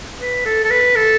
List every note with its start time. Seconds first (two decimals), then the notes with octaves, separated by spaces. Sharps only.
0.20 B4
0.45 A4
0.63 A4
0.70 B4
0.95 A4